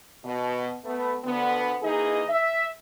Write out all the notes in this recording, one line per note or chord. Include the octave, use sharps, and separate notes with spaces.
B2
A3 B3
D2 D3 B3
E3 A#3 D#4 G#4 D#5
E5